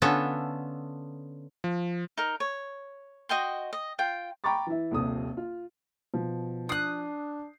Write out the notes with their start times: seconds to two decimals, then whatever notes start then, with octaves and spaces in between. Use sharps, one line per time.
0.02 D3 B3 C#4 F4 A4 E5
1.64 F3
2.17 D#4 A#4
2.40 C#5
3.29 F#4 D#5 G5 C6
3.73 D#5
3.99 F4 G5
4.44 G5 A#5 B5 C#6 D6 A6
4.67 E3 E4
4.91 D#1 A#1 C3 A4 D#6
5.37 F4
6.14 B2 F3
6.69 D4 D#6 F#6 G6 C7